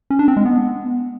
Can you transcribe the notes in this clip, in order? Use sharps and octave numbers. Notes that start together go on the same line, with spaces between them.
C#4
D4
C4
G#3
B3